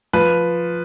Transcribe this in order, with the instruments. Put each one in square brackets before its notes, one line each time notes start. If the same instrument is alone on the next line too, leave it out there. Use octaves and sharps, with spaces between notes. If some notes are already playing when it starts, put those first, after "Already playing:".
[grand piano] F3 B4